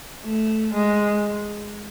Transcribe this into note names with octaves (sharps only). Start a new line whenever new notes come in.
A3
G#3